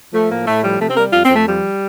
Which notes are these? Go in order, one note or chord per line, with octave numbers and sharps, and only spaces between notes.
F3 A3
A2 A#3
A2 A3
F3 G3
C3 A3
C4
G3 A#4
F2 F4
C4
F2 A3
F3 G3